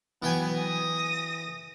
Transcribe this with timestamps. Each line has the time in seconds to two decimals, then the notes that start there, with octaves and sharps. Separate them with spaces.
0.22 E3 F#3 B3 G5 G#5
0.58 D#6 A#6